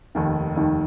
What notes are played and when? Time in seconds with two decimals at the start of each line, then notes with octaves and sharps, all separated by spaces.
0.15 F1 D#2 D#3
0.56 F1 D#2 D#3